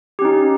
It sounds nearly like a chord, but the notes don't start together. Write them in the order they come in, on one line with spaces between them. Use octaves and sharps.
G4 C#4 D#4